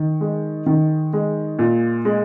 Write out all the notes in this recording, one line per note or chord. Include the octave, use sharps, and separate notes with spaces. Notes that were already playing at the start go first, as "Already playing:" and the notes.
Already playing: D#3
G#3
D#3
G#3
A#2
G#3